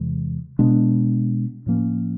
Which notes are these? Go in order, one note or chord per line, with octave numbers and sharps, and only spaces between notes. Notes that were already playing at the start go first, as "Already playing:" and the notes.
Already playing: E2 C3 E3 G#3
B2 G#3 B3 D4
A2 F3 A#3 C#4